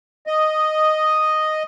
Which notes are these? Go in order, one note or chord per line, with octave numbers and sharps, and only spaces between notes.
D#5